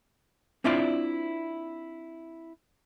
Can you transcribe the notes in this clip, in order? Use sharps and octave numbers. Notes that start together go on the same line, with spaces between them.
C4 D4 E4 F4 C5 D5